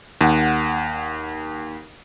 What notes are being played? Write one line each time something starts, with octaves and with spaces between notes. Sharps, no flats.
D#2 F#5